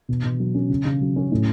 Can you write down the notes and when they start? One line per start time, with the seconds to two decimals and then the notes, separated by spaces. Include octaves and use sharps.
0.09 B2
0.24 B2
0.40 F#3
0.55 C#4
0.69 C#3
0.85 C#3
1.01 F#3
1.16 C#4
1.32 A2